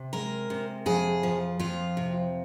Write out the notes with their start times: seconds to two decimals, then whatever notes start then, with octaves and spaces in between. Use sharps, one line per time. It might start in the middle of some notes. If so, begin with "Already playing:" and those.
Already playing: C3
0.13 G#3 A#4
0.50 C3
0.86 F2 G#4
1.23 F3
1.59 F2 F4
1.97 C3